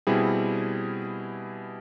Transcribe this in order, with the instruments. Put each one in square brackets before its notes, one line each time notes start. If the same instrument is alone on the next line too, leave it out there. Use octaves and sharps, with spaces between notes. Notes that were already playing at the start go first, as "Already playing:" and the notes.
[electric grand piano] B2 G3 C4 E4 G#4